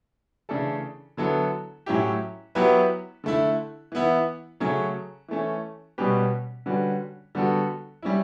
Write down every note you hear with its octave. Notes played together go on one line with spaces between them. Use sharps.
C#3 E3 A3 D4 A4
D3 F#3 B3 E4 A4
A2 F#3 C#4 E4 G4
F#3 B3 E4 G4 B4
D3 A3 E4
E3 B3 E4
C#3 F#3 A3 C#4
E3 A3 C#4
B2 G3 C#4 G4 B4
D3 G3 C#4 F#4 B4
D3 G3 B3 F#4 A4
G3 C#4 E4